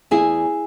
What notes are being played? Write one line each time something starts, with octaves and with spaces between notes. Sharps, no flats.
E2 E4 G#4